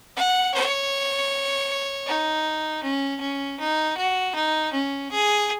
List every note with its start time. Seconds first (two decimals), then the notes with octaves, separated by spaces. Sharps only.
0.16 F#5
0.54 C#5
2.06 D#4
2.83 C#4
3.20 C#4
3.59 D#4
3.97 F#4
4.35 D#4
4.73 C#4
5.11 G#4